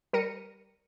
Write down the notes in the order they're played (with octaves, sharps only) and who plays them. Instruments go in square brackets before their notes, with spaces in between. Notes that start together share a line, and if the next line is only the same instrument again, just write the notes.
[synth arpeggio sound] G3 A#4 A#6 C#7 D#7